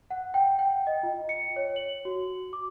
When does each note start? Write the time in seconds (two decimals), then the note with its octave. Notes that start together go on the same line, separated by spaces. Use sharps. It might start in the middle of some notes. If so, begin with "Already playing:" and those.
0.11 F#5
0.34 G5
0.59 G5
0.87 D#5
1.03 F4
1.29 C#7
1.56 C#5
1.76 F#7
2.05 F#4
2.53 D6